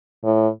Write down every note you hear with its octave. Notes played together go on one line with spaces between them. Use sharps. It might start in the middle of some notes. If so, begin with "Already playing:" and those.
A2